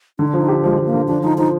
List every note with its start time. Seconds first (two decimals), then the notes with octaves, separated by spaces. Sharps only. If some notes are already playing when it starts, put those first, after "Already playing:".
0.19 D3 D#4
0.28 D4
0.34 F3 D#4
0.48 G4
0.63 F3 G#3
0.78 F3
0.86 A#3
0.94 D3
1.08 F3 D4
1.23 F3 D#4
1.38 F3 D#4